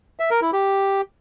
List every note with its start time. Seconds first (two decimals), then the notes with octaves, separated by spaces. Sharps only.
0.19 E5
0.31 A#4
0.42 E4
0.53 G4